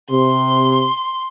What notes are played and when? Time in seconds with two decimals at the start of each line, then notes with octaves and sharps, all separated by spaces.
0.10 C3 C6